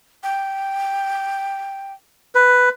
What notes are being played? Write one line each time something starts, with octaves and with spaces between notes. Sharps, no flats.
G5
B4